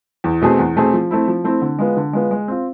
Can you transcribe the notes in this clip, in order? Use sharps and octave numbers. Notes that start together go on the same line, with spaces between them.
E2
B2 A3 C4 G#4
E2
B2 A3 C4 G#4
F3
A3 C4 E4
F3
A3 C4 E4
D3
G#3 B3 F4
D3
G#3 B3 F4
G#3
C4 F4